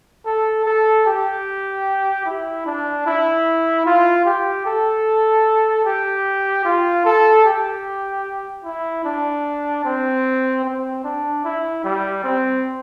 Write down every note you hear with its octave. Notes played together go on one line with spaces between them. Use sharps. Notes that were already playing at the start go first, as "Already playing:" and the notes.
A4
A4
G4
E4
D4
E4
F4
G4
A4
G4
F4
A4
G4
E4
D4
C4
C4
D4
E4
G3
C4